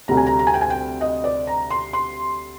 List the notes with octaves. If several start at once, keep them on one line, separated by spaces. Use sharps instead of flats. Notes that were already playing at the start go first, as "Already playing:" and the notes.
D2 C3 G3 A#5
G#5
A#5
A#5
G#5
G5
G#5
G5
D#5
D5
A#5
C6
C6